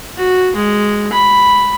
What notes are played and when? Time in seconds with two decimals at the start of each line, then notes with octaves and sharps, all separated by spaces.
0.17 F#4
0.56 G#3
1.13 B5